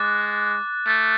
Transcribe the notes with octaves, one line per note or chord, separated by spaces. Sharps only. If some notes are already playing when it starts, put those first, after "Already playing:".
Already playing: G#3 D6 F#6 A6
A3